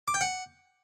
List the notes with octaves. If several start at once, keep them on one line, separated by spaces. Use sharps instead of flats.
D6
G5
F#5